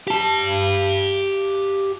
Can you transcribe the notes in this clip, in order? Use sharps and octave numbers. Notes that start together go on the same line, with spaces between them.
G4 A5